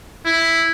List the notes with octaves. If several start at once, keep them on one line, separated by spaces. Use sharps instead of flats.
E4